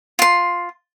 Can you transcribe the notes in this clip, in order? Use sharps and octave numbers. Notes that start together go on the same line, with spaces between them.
F4 C6